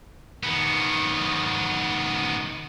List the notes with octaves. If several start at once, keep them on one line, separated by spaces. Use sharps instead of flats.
D#3 B3